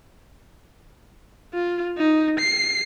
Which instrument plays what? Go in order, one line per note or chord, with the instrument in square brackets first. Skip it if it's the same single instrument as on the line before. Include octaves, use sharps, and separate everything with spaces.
[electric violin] F4
D#4
C7